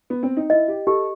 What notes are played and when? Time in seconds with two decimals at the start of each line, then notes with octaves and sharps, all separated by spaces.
0.10 B3
0.23 C4
0.37 D#4
0.50 E4 D#5
0.68 G4
0.87 G4 A4